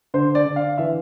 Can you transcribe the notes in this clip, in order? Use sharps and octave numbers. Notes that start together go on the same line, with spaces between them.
D3 C5
D5
D3
F5
E3 E5